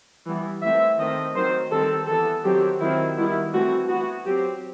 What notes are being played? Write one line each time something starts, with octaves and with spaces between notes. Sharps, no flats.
E3 G3 B3
E3 A3 C4 E5
D#3 A3 C4 D#5
D#3 F#3 C4 C5
D#3 G3 C4 A4
E3 B3 A4
D#3 F#3 C4 G4
D#3 F#3 C4 E4
D#3 G3 B3 E4
E3 A3 C4 F#4
E3 B3 F#4
F#3 C4 G4